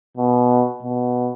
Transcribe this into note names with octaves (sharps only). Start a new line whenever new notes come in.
B2
B2